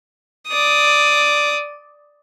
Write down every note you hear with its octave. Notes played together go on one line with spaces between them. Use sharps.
D5 D#6